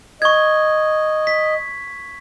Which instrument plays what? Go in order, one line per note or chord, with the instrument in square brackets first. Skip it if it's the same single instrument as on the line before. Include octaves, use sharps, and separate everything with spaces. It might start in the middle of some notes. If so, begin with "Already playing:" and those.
[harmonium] D#5 [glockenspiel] C#6 G#6
[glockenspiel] B6